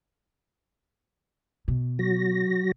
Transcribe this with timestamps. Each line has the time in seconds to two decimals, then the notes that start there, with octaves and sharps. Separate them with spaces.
1.68 B2
1.99 F#3 F#4 A#6